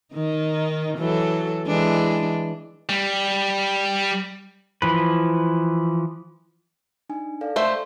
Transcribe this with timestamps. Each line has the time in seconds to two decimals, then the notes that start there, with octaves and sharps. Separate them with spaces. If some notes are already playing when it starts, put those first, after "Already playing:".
0.14 D#3 D#4
0.97 E3 F#3 A4
1.67 E3 G#3 D4
2.89 G3
4.82 E3 F3 B4
7.09 D4 D#4 G#5
7.41 A4 D5 F5
7.56 A3 C5 E5